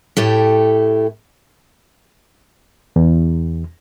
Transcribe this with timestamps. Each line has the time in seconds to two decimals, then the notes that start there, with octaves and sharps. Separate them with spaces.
0.17 A2 A3 G4
2.96 E2